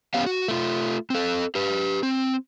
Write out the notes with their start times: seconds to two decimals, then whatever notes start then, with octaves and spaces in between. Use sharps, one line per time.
0.14 B3 C#4 G4 F5
0.26 F#4
0.48 A3 F4
1.10 C4 A4
1.55 G4 B4
2.03 C4